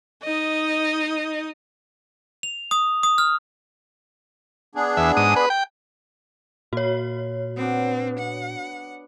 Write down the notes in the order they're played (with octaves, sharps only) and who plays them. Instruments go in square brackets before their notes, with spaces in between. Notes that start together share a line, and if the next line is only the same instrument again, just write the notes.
[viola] D#4 D#5
[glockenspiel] F7
D#6
D#6
F6
[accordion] B3 D4 G#4
[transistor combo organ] E2 E5
G#2 D#6
B4
G5
[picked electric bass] A#2 [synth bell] F#4 C#5
[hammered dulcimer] B3 D4 [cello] C4
[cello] F#5